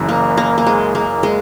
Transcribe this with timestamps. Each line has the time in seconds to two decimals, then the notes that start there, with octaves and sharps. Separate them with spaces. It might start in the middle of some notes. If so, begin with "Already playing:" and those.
Already playing: F#1 F#2 C#3 E3
0.09 A#3
0.37 A#3
0.58 A#3
0.66 G#3
0.95 A#3
1.23 G#3